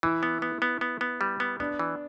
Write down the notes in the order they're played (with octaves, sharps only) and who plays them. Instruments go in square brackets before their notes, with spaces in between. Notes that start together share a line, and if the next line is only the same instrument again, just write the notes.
[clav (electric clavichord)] E3 [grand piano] E4
[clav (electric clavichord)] B3
B3
B3
B3
B3
G3
B3
[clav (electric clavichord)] B3 [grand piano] D4
[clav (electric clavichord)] E3